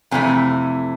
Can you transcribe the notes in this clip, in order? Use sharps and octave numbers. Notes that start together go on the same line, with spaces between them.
F2 C3 E3 A3 G#5